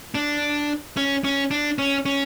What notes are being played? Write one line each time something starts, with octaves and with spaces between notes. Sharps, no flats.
D4
C#4
C#4
D4
C#4
C#4